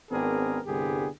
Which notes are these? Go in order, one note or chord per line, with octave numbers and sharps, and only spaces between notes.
G#1 B3 C4 D4 G#4 A#4
C2 G2 D3 B3 G4 G#4